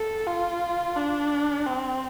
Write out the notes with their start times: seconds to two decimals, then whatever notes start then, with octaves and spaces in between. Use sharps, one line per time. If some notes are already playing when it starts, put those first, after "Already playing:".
Already playing: A4
0.27 F4
0.97 D4
1.66 C4